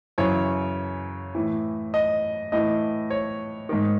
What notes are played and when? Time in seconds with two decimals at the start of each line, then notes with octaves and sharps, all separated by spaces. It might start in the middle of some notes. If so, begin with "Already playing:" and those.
0.18 F#2 C#3 E3 C#5
1.35 A2 E3
1.94 D#5
2.52 A2 E3 D#5
3.10 C#5
3.69 G#2 D#3